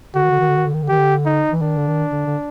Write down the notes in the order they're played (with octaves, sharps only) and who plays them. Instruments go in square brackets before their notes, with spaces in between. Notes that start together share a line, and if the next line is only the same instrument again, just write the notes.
[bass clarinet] D3 [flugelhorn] F#4
[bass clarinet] D#3
D3
D#3
D3
D#3
D3
D#3
D3
[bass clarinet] D#3 [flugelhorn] G4
[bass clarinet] D3
[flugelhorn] D#4
[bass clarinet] E3
[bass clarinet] D#3 [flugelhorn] D4
[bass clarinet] D3
D#3
D3
D3